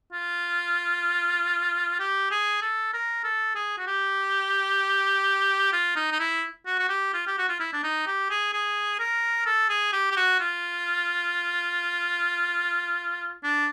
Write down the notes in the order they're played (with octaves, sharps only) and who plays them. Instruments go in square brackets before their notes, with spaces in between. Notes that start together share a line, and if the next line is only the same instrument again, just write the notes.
[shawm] F4
G4
G#4
A4
A#4
A4
G#4
F#4
G4
F4
D#4
D#4
E4
F#4
F#4
G4
F4
G4
F#4
F4
E4
D4
D#4
G4
G#4
G#4
A#4
A4
G#4
G4
G4
F#4
F4
D4